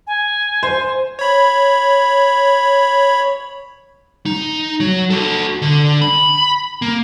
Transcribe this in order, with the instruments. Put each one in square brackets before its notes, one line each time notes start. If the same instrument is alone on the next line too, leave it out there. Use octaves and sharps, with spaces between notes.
[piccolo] G#5
[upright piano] C5
[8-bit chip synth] C#5 B5
[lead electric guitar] D#4
F#3
F#4 A4
D3
B5
A#3